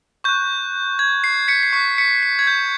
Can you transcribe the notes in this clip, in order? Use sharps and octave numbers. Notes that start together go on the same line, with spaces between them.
C#6 F#6 G6
G#6
C7
B6 C#7
C7
C#6 F#6 B6 C#7
B6 C#7
C7
G#6
G6